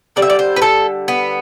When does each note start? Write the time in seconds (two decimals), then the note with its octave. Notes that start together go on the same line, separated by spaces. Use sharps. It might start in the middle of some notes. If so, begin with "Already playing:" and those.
0.16 D3 G3 D5
0.22 E5
0.30 D5
0.39 C5
0.56 B4
0.62 A4
1.08 B3